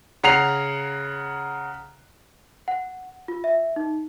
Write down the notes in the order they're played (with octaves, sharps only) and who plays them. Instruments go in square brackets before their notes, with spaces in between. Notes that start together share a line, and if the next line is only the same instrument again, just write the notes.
[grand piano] C#3 F#5 A#5 C7 F7
[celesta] F#5
F4
E5
D#4